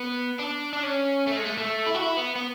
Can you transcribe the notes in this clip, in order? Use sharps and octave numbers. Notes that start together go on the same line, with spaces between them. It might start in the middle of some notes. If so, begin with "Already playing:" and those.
Already playing: B3
D4
D4
C#4
A3
G#3
A3
A3
E4
F#4
E4
B3
B3